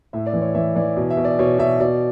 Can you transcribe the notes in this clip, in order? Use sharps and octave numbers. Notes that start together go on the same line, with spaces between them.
A2 E5
D5
E3
C#5
E3 E5
E3 D5
B2
E5
B2
D5
B2 C#5
B2 E5
B2 D5